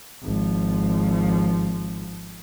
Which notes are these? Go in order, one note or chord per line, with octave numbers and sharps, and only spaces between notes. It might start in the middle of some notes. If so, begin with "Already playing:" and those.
G#1 F3